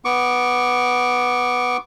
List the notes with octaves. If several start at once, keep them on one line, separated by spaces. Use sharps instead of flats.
B3 C#6 D6